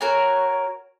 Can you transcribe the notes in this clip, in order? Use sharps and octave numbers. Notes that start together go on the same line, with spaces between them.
F#4 A#4 C#5 G#5